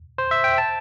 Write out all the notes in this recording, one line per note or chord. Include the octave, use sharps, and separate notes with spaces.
C5
E5
G5
A5